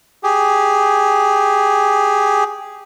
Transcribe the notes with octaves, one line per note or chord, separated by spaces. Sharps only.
G4 G#4